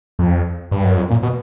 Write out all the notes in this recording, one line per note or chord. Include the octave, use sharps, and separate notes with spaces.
F2
G2
F#2
F2
A#2
B2